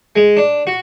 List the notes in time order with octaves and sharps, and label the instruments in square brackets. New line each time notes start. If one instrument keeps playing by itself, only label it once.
[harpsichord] G#3
D4
F#4